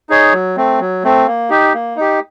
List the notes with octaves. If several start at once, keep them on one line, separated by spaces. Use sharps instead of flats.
D#4 G#4 C#5
F#3
A3 C4
F#3
A3 C4
A#3
D#4 G4
A#3
D#4 G4